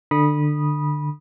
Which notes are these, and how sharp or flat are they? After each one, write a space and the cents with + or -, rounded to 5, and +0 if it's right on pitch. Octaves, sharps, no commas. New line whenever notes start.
D3 +20 B5 -20 D#6 -10